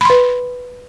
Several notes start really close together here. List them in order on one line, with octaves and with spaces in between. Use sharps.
B5 C6 B4